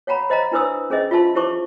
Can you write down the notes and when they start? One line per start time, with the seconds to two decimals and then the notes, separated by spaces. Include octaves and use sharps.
0.07 C#5 F5 F#5 A#5 B5
0.30 C5 D#5 F5 A#5
0.52 D4 E4 B4 C5 D#6 E6
0.90 C#4 G#4 C5 D#5 E5
1.11 F4 C5 E5 F5 A5 C6
1.35 E4 G4 C5 C#6 D6